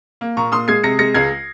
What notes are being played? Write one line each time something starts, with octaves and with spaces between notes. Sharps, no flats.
A#3
A#2 A#5 C#6
A#2 C6 D#6
G#3 G#6 C7
C3 A#6 C#7
G#3 A#6 C#7
C#2 G#6 C7